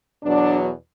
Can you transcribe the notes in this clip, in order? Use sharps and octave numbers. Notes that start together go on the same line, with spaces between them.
E2 B2 F#3 D4